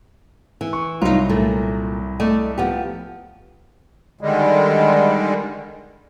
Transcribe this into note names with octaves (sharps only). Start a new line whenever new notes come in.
E3
C#6
C2 F#3 D#4 F4
A#2 A3
A3 D5 D#5
F3 B3 G4
D3 D#3 G3 G#3